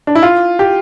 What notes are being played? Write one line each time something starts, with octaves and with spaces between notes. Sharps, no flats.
D4
E4
F4
G4